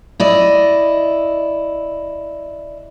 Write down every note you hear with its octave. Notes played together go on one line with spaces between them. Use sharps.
E4 D5 D#5